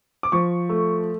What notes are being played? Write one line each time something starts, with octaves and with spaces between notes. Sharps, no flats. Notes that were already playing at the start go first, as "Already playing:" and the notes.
D6
F3 C#6
A3